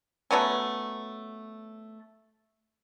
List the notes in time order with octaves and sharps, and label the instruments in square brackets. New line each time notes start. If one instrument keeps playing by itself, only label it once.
[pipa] F#3 A3 B3 C#4